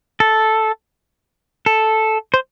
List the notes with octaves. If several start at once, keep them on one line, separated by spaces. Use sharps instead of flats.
A4
A4
C5